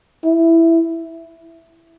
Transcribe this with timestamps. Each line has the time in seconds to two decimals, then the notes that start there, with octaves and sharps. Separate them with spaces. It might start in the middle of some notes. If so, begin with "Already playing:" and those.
0.24 E4